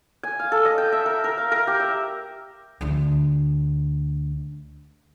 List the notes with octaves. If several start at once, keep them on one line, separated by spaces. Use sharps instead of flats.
G#5
F5
A4
D#5
G5
E5
A#4
A#4
F5
A#4
G4
E5
D2 D4